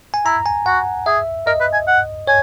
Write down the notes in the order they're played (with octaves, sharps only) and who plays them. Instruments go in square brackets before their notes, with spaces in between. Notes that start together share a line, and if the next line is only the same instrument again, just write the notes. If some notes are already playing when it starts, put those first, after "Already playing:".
[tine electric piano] G#5
[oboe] E4 [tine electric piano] A#5
[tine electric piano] G#5
[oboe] F#4 [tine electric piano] F#5
[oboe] G#4 [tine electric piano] E5
[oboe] A#4 [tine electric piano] D#5
[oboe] B4
G#5
F#5
[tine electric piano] C#5 [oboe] G#5